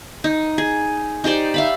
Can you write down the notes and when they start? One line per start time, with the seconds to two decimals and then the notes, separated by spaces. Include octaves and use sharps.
0.24 D#4
0.58 G#4
1.24 D#4 G4 C5 D5
1.54 E5 F5 B5